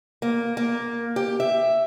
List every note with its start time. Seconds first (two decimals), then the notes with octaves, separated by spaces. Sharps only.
0.22 A#3
0.57 A#3
1.16 G4
1.40 E5